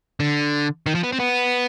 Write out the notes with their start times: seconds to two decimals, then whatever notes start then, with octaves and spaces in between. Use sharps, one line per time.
0.20 D3
0.86 D#3
0.95 F3
1.03 B3
1.13 C4
1.20 B3